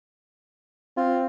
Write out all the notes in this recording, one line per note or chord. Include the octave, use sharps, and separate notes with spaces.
C4 F4